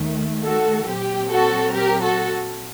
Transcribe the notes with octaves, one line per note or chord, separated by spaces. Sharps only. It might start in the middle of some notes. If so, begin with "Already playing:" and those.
Already playing: D#2 D#3 A3
F#4 A4
A#2 F#3 C4 G4
F#4 A4
G4 A#4
F#4 A4